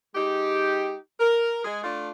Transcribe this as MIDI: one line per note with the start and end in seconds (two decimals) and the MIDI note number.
0.15 0.96 56
0.15 0.96 63
0.15 0.96 67
1.20 1.61 70
1.65 1.79 56
1.65 1.79 68
1.84 2.11 57
1.84 2.11 62
1.84 2.11 65